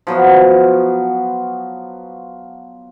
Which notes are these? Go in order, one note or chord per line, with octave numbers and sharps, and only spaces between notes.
F3 F#3 B3